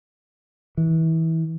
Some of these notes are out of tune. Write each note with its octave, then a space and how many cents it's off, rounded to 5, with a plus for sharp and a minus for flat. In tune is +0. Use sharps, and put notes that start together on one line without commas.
E3 -25